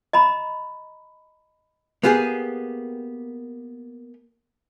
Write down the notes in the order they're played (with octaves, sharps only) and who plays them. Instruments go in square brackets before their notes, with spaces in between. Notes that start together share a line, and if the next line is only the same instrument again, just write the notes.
[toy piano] D#5 A#5 B5
[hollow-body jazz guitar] A#3 B3 G4 G#4